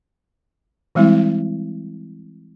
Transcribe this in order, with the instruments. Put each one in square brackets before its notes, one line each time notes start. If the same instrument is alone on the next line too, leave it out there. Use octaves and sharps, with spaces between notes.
[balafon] E3 G3 G#3 C4 E4